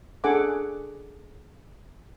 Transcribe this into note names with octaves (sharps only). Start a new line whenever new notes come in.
D4 G#4 A4 F#5 G#5 D6